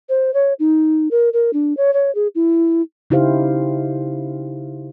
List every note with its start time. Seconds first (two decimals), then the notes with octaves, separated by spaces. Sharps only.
0.09 C5
0.34 C#5
0.59 D#4
1.11 A#4
1.33 A#4
1.53 D4
1.77 C#5
1.94 C#5
2.15 G#4
2.35 E4
3.10 C#3 D#4 E4 G4 C5 F5